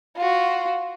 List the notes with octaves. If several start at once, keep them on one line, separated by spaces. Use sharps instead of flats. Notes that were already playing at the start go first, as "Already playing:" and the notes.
F4 F#4